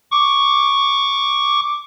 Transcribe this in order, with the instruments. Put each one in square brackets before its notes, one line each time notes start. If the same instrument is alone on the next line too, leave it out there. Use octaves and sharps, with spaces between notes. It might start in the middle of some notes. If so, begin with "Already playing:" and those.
[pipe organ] C#6 D6